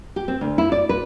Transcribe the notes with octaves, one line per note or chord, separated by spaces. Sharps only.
G4
C4
D2
E4
D5
B4